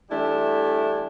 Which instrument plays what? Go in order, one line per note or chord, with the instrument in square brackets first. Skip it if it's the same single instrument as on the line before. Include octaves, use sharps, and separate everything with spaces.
[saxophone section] E3 G3 A3 D4 E4